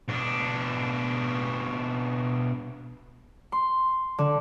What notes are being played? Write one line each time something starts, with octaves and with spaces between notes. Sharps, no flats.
B2 D4
C6
D3